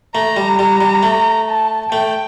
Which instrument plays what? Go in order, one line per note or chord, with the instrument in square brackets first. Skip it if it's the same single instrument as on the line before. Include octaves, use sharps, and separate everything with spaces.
[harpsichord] A3 [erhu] A#5
[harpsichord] G3
[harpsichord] G3 [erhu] A#5
[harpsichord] G3
A3
[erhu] A5
[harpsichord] A3 [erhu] G5